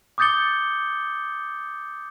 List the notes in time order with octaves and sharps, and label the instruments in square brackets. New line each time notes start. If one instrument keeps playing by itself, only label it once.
[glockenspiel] D6 D#6 G6 A6 C#7 G7